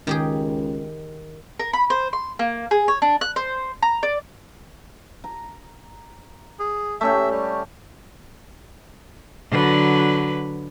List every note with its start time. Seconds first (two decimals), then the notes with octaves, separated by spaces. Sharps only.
0.07 C#2 D#3 G4 G#4
1.59 A#4
1.73 B5
1.90 C5
2.13 C6
2.39 A#3
2.71 G#4
2.88 C#5
3.02 D4
3.21 F#6
3.36 C5
3.82 A#5
4.03 D5
5.24 A#5
6.60 G#4
7.01 A3 C#4 G4 E5
7.31 G3
9.50 D3 F#3 B4